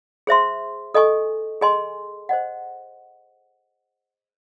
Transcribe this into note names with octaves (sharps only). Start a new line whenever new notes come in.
G#4 C5 E5 C6
A4 D#5 G#5 C#6
G#4 D#5 G#5 C6
C5 D#5 F#5